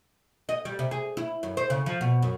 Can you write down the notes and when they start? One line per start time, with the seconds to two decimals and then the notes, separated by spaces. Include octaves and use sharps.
0.49 D#5
0.65 G3
0.79 C3
0.91 G#4
1.17 E4
1.43 F#2
1.57 C5
1.70 C#3
1.86 F3
2.01 B2
2.22 F#2